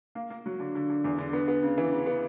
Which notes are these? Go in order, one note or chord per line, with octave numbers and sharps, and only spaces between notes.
A#3
A#3
F#3
D3
D3
D3
E2
D3
B3
B3
C#3
E3
C#3
B3